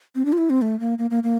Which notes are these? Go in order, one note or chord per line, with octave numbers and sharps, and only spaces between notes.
C4
D4
F4
E4
C4
A3
A#3
A#3
A#3
A#3